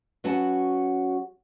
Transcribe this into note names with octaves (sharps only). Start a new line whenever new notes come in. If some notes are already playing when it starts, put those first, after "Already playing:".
F#3 C#4 F#4 B4 F#5 A5